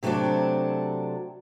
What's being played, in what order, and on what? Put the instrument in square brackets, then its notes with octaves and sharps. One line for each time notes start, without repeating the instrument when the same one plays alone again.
[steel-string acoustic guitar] C3 F#3 A3 C4 D4